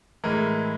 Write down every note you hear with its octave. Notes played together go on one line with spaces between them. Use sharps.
A2 E3 G#3 A#4